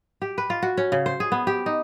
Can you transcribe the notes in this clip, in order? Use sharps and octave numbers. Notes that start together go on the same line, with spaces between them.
G4
B4
F4
F#4
C#4
C#3
C5
G#4
B3
G4
D#4